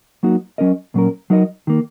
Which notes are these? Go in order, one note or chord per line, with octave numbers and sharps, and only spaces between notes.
F#3 A#3 D#4 F#4
F#3 C#4 A#4 D#5
A#2 F#3 C#4 A#4
F#3 D#4 A#4 D#5
D#3 A#3